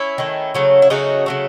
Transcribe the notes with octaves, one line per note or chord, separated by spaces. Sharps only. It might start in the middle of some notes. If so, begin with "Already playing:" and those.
Already playing: C#4 E4
D#3 A3
C#3 F#3 A3
E4
C#3 F#3 A3 D#4 F#4
C#3 F#3 A3